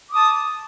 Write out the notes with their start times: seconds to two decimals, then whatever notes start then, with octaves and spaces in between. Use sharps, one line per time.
0.10 D6
0.13 D#6
0.16 A5